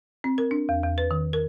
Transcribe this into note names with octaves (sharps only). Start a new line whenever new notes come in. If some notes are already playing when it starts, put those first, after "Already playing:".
C4
A#4
D4
E2
E2
B4
D#3
A#4